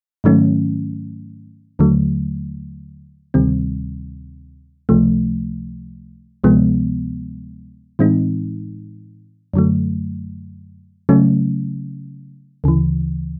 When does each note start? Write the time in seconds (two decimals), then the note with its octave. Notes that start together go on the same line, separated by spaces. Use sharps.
0.24 G#2 D#3 F#3 A3 C#4
1.79 D#2 D3 F#3 A3
3.34 D2 C3 D#3 G3 C4
4.89 C#2 C3 F3 A3
6.44 D2 C3 F3 G#3 B3
7.99 A2 E3 G#3 C4 D#4
9.54 F#2 D3 F#3 A3
11.09 C#3 F#3 A3 C#4
12.64 D2 C#3 E3